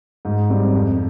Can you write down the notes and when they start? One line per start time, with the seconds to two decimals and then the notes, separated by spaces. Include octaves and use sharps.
0.25 G#2
0.49 G3 C4
0.74 F2